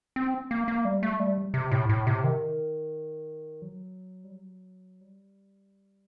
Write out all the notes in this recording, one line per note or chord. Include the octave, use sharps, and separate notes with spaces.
C4
A#3
A#3
G3
A3
G3
C3
A2
A2
C3
D#3
F#3
G3
F#3
G3